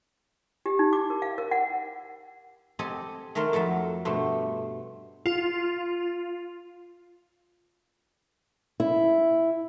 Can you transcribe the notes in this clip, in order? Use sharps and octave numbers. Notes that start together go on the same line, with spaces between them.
G4
D#4
D6
A#4
F5
A#4
F#5
C4 G4 A4 D#5 G#5
D#3 A3 A4 A#4 C5 C6
F2 F#3 A4 E5
G2 B2 A3 C5
F4
E4